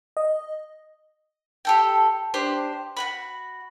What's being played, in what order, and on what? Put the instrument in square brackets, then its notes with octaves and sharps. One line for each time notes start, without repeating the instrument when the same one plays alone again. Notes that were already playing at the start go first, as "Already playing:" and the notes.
[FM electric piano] D#5
[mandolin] G4 A4 G5
D4 G4 C5
F#4 F#5 B5